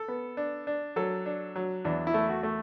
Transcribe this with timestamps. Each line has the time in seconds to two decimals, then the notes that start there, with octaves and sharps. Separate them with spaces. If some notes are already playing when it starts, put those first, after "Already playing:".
Already playing: A4
0.08 B3
0.37 D4
0.67 D4
0.96 F#3 A4
1.26 D4
1.56 F#3
1.85 E2 D4
2.07 E4
2.14 A3
2.29 F#4
2.43 A3